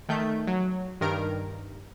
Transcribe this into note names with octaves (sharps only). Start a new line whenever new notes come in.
D#3 A3 G6
F#3
G2 D#3 A#4 D7